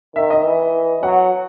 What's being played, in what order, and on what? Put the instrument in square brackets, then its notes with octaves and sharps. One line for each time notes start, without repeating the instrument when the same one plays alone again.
[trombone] D#3 [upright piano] E5
[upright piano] D#5
[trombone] E3
[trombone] F#3 [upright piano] F#5